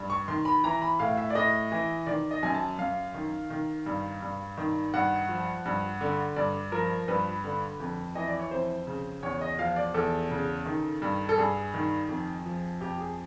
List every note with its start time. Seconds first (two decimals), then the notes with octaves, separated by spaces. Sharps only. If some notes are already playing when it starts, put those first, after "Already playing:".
Already playing: G2
0.10 C#6
0.28 D#3 C6
0.45 B5
0.64 E3 A#5
0.82 B5
0.99 A2 F5
1.17 E5
1.30 D5
1.35 A2 D#5
1.72 E3
2.06 D#3 D5
2.31 D#5
2.43 F#2 G#5
2.54 A5
2.79 F#2 F5
3.14 D#3
3.50 D#3
3.86 G2
4.22 G2
4.58 D#3
4.93 G2 F#5
5.29 F3
5.65 G2
6.01 D3
6.36 G2 D5
6.72 F3 A#4
7.08 G2 B4
7.44 D3
7.80 F2
8.15 E3 D#5
8.27 D5
8.39 C#5
8.51 F2 C5
8.87 C#3
9.23 E2 C#5
9.41 D#5
9.59 F3 F5
9.76 D5
9.94 E2 A4
10.30 C#3
10.66 D#3
11.02 G2
11.29 A4
11.38 G2 G#4
11.74 D#3
12.09 F2
12.45 F3
12.80 F2 G4
12.99 G#4